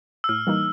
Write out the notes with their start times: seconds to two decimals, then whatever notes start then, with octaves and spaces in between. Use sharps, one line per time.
0.24 E6
0.29 A2 F6
0.47 E3 G3 A#3 D#4